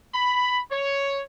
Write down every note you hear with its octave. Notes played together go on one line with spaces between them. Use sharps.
B5
C#5